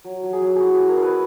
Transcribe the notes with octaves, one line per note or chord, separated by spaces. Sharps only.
F#3
F#3
G#4
F#3
E4 F#4 G#4
E4 G#4
A#4
E4
B4